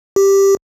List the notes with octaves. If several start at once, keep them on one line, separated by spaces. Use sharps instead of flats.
G4